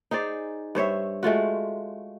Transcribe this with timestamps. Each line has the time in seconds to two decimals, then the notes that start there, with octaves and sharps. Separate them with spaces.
0.11 D#4 G#4 C5 D5
0.75 G2 C5 C#5 E5
1.23 G#3 A3 F4 F#4